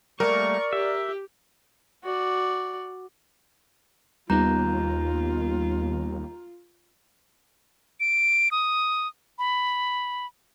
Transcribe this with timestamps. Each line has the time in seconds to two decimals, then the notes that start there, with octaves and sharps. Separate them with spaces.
0.20 G3 A3 A#3 A#4 D5 C#6
0.73 G4 E5
2.04 F#4 D5
4.30 D#2 G3 B3 D#4 F4 A#5 G6
8.00 D7
8.51 D#6
9.39 B5